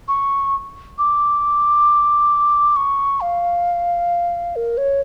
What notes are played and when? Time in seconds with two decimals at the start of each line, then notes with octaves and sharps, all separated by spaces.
0.08 C#6
0.98 D6
2.76 C#6
3.21 F5
4.56 A#4
4.78 C#5